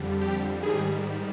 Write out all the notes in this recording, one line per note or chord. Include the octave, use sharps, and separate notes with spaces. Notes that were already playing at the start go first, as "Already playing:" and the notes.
Already playing: F2 D3 G3
G4
G#2 D#3 G3 G#4